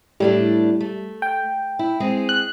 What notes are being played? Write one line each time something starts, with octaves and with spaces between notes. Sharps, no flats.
A2 G3 A3 D4
A3
G5
E4
G#3 C4 G#4
F#6